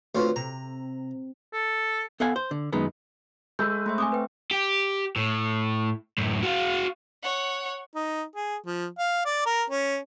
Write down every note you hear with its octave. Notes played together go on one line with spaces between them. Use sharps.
D2 C4 F4 B4 C#5
C3 A#5
A4
B3 A4 F5 F#5 G#5
C5
D3
F#2 D#3 G#3 B3
G#3 A3 B4 E6 G6
A3 C5 E5 C#6
C4 G#5 D6 D#6
B4 G5
G4
A2
F#2 A2
F#4 F5
C#5 F#5
D#4
G#4
F3
F5
D5
A#4
C#4